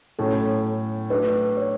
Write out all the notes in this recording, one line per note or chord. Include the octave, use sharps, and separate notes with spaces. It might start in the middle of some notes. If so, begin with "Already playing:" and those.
A2 F#3 C#4 A4
F#3 A3 D4 B4
C#5